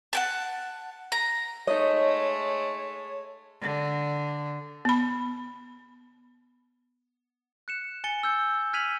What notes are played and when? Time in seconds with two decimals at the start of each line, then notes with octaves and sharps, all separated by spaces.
0.13 F#5 G5 A5
1.12 A#5
1.67 G#3 A3 D#4 C#5 D#5
3.61 D3
4.85 B3 B5
7.68 F#6 C#7 E7
8.04 G#5 A6 C#7 G7
8.23 E6 G6 C#7
8.73 F6 G#6 B6 D#7 F7 F#7